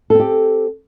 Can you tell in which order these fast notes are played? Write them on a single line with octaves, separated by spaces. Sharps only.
A4 C4 G4